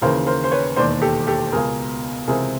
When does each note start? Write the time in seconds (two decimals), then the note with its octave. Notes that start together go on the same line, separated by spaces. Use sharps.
0.02 D#2 C#3 E3 A#4 C5
0.26 A#4 C5
0.44 C5
0.51 B4 C#5
0.76 E1 D#2 D#3 C5 D5
1.02 G4 A4
1.27 G4 A4
1.52 C#2 B2 G#4 A#4
2.27 C#2 C3 E3 G#4 A#4